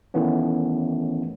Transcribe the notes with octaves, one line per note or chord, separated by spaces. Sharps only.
D#3 E3 A3 B3 C#4